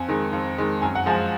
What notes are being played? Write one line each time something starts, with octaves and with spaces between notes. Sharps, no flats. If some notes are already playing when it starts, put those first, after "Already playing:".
Already playing: F2 G#5
D#3 G#3
F2
D#3 G#3
F#2 G#5
F#5
F3 G#3 G#5